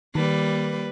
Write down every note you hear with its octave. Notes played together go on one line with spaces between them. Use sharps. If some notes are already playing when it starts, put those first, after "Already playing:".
D#3 G3 A#3 B4